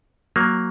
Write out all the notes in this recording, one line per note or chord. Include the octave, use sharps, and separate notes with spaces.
F#3 A#3